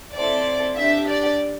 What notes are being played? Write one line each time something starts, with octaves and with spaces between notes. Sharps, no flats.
C4 E4 A4 D5
D4 G4 E5
D5